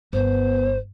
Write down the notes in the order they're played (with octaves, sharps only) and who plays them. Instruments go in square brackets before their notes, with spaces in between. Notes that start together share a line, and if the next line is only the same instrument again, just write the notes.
[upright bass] G1 [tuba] B3 [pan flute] C5